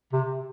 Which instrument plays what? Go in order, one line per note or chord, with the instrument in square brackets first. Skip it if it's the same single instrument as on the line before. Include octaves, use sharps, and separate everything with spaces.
[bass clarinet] C3